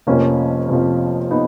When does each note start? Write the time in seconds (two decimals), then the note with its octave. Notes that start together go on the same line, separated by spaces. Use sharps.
0.07 F1 F2 F3 A#3 C#4
0.69 F1 F2 F3
1.31 B3 D#4